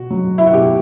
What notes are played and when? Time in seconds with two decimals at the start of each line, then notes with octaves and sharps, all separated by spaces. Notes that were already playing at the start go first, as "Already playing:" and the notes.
Already playing: B2 F#4
0.10 F#3
0.38 E4
0.46 F#4
0.53 B2 G4